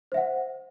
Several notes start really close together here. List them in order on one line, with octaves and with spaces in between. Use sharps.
C5 E5 F#5